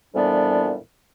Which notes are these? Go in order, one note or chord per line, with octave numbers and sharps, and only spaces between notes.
F2 A#2 E3 G3 B3 D4